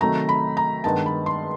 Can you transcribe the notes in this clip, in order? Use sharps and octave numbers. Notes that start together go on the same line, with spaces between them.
C3 D#3 F#3 A3 A#5
B5
A#5
G2 D#3 G#3 B3 A5
B5
C6